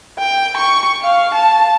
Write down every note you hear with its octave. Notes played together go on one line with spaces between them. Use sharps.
G5
C#6
F5
A5